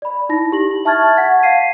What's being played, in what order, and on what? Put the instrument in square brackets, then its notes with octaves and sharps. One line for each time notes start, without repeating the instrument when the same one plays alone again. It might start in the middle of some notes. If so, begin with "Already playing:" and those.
[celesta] D5 B5
D#4 E4 A#6
G4 F#7
E5 A5 C#6 F6 G#6 A6
F#5 G#6 B6
F5 B6 C7 D#7